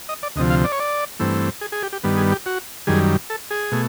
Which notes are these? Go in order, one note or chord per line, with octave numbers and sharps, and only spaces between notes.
D#5
D5
D2 C3 F3 D#5
F5
D5
C#5
D5
G2 E3 A3 C4
G#4
G#4
G4
G4
G2 D#3 G3 B3
G#4
G4
F#4
F#2 D#3 G3 G#4
A4
G#4
B2 A3